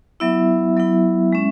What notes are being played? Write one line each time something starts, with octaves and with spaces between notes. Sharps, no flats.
F#3 B3 E4 E5
F#3 B3 E4
G#3 C#4